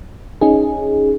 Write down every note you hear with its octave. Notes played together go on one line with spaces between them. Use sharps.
C#4 D#4 G#4